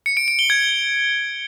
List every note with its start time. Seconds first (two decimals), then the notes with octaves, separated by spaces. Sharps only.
0.06 C#7
0.17 D7
0.28 D7
0.39 G7
0.50 G#6